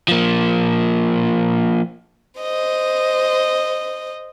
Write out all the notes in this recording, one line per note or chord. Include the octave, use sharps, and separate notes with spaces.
F3 A#3
C5 D#5